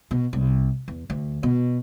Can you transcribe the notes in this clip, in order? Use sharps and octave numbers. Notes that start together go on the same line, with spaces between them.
B2
C2
E2
D2
B2